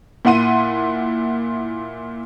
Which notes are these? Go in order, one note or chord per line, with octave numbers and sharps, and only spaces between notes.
A#2 E4 F#5 C6 D#7